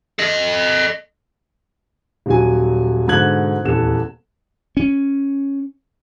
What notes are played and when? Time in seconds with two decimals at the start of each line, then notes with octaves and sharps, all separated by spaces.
0.19 A4 D#5
2.26 D#1 F#3 G#5
3.08 G#2 B2 D3 F#6 G#6 F#7
3.64 D#1 E2 A4 E7
4.77 C#4